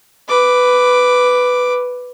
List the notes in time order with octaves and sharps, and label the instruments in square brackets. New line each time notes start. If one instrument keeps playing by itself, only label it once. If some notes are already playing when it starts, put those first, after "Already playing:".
[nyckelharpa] B4 D6